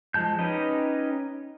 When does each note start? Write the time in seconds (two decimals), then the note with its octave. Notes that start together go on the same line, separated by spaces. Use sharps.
0.14 F3 G#3 A5 G6
0.39 C#4 D#4 G4 B4 D#5